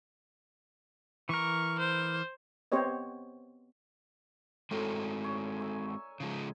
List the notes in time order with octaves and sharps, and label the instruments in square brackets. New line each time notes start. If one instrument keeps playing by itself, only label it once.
[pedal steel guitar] E3 A#4 [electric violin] C#6
[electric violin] C5
[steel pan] B3 C4 G4 C5 C#5 D#5
[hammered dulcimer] A2 A#4 D5 [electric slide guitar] G#3 C4 F#4
[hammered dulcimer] C#5
E5 G#5 C#6
[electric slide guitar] C#3 F3 G#3